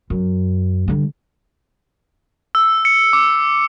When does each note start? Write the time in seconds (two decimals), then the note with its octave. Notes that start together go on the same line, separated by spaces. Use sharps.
0.10 F#2
0.88 D3 G3
2.55 E6
2.85 C#7
3.13 D6